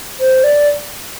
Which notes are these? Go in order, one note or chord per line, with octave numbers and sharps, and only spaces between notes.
C5
D5